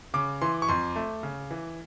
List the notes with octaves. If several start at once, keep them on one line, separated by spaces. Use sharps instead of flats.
C#3 D6
E3 C6
C#6
F2 C6
A3
C#3
E3